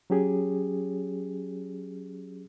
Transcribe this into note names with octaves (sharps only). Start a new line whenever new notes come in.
F#3 C#4 G4 G#4